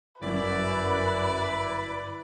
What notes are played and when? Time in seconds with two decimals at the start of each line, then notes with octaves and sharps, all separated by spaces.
0.21 G1 F#2 E4 B4 D5